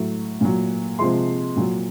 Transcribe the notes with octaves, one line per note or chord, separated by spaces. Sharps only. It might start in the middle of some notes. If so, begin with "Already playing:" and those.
Already playing: A2 F#3
A#2 F#3
C3 F3 G#3 C6
A#2 F#3